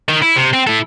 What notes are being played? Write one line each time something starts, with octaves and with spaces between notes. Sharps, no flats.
D#3
E4
C3
C4
E4 A4